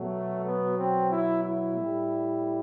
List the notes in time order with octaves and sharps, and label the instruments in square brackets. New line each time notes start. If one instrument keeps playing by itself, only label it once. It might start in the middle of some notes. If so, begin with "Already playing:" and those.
Already playing: [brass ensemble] B2 F#3 A3
B3
C4
E4
E4
A2 G3